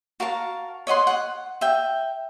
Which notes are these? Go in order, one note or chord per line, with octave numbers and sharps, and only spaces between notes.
F#4 A#4 F5 A5
C#5 D#5 F#5 C6
F#5
E5 G5